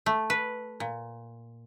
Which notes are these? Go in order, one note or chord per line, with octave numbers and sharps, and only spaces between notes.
A3
B4
A#2